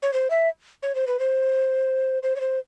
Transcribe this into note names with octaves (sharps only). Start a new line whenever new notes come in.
C#5
C5
E5
C#5
C5
B4
C5
C5
C#5
C5